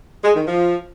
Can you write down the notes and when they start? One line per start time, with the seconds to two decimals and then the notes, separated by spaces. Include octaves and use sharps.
0.24 G#3
0.36 D#3
0.47 F3